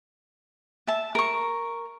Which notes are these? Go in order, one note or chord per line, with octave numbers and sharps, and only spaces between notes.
E5 A5
A#4 C#6